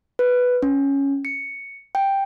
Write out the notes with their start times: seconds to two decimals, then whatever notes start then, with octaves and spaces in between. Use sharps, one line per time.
0.19 B4
0.63 C#4
1.25 C#7
1.95 G5